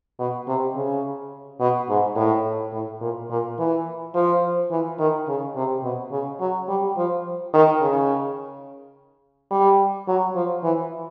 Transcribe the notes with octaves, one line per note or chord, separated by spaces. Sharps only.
B2
C3
C#3
B2
G#2
A2
A2
A#2
A#2
E3
F3
E3
D#3
C#3
C3
B2
C#3
F#3
G3
F3
D#3
C#3
G3
F#3
F3
E3